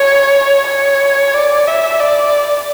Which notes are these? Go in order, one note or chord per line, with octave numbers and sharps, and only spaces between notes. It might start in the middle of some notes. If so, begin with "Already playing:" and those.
Already playing: C#5
C#5
D5
E5
D5